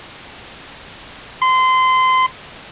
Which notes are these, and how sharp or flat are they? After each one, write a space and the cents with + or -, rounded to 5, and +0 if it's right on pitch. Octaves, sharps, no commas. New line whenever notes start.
C6 -25